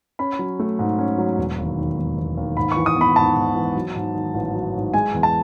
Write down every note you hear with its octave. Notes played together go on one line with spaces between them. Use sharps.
C#4 B5
F#3
A3
G#2
C#4
F#3
E1
D#2
D#3
E1
E1
D#2
G#2 B5
E3 C#6
D#6
B3 B5
G#2 A5
G#2
E3
F#3
G#2
D#3
A1
F#3
G#2
G#3 G#5
E2
A5